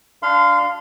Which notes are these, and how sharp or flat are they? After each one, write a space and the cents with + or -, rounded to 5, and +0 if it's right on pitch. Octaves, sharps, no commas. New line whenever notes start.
D4 +0 F5 +0 C6 -30